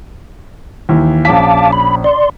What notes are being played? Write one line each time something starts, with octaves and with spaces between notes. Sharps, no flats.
D#2 E3
A#1 C#4 F5 A5 D6 B6
B5
D5 C6